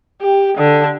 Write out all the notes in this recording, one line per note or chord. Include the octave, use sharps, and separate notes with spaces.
G4
D3